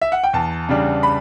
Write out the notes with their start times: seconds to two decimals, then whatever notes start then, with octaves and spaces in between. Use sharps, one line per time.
0.02 E5
0.12 F#5
0.23 G5
0.33 E2 A5
0.69 C#3 G3 D4
1.03 B5